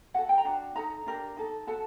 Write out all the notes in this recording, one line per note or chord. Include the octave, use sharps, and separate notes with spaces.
F#4 A4 F#5
G5
A#5
D4 F#4
D#4 A4 A#5
D4 G4 A#4
D#4 A4
F#4 A4 A5